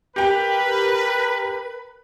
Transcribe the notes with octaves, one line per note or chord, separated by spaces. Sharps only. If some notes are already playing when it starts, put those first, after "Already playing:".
G4 A#4 B4 G5